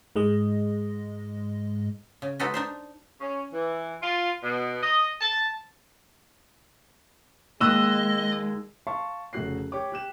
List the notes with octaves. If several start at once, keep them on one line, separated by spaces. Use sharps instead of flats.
G#2 G#3 D#5
C#3
G#3 D#4 F#4 A4 B4 D#5
D4 D#4 C5
C#4
E3
F4
B2
D#5
A5
D#2 G#3 D#5 E6 F#6
F5 A5 C6 C#6
F1 C#3 F#4 F#6 C7
G4 C#5 D6
G4 F#6 E7